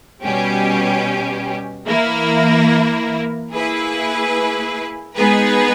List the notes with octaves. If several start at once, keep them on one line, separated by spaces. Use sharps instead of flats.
B2 G3 C#4 G4
E3 A#3 E4 A#4
A#3 E4 G#4 B4
G#3 B3 D#4 G#4 B4